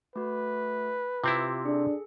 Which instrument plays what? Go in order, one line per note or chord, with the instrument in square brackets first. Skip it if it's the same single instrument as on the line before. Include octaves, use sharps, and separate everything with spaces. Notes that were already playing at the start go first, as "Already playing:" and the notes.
[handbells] A3 F#4 [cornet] B4
[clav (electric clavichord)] C3 C4 E4 [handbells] F4 G4
[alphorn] D4 [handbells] G#4 A4